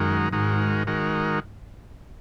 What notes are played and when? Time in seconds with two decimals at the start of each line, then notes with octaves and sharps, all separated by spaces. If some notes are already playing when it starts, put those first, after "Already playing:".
Already playing: F#2 D#3 G#3 F#4 A#4
0.32 G#2 D#3 G#3 F#4 A#4
0.87 D#3 G#3 F#4 A#4